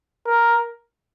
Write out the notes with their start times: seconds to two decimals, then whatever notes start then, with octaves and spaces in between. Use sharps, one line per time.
0.26 A#4